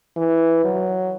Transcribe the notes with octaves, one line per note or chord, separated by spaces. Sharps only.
E3
F#3